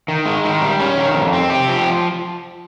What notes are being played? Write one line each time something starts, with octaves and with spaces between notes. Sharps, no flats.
D#3
G#3
D#3
G3
C#4
D#3
F2
C4
G4
F3